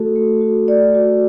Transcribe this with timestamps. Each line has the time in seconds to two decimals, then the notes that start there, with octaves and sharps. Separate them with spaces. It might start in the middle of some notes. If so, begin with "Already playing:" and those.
Already playing: A3 F#4 A4
0.16 A3
0.41 F#4
0.68 A3 D5
0.95 F#4